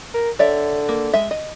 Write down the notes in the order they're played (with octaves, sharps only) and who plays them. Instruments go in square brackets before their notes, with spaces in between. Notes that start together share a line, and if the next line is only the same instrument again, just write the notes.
[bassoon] A#4
[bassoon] D3 [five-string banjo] C#5 D5 E5
[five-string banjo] A#3
G#3 E5
D#5